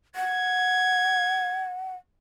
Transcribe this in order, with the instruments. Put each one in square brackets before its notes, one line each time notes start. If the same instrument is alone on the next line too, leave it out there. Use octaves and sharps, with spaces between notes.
[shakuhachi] F#5 [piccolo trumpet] G#6